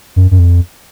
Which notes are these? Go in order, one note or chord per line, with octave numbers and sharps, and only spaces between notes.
F#2
F#2
F2